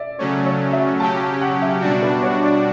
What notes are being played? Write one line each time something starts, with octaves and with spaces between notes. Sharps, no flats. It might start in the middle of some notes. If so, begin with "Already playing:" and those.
Already playing: D5 E5
C#3 F#3 A3 C#4 C#5
C#5
E5
C#3 F#3 C#4 G4 A5
A5
F#5
E5
B2 G3 D4 F#4 D5
B4
C#5
D5